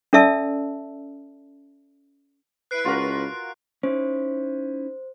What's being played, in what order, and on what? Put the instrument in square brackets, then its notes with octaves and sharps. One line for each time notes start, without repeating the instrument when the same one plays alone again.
[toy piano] C#4 A4 D5 E5 A5 E6
[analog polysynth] E4 B4 [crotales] F#6 C7 D7
[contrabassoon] C#2 [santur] F4 F#4 A#4
[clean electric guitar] C#4 D#4 E4 [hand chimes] C5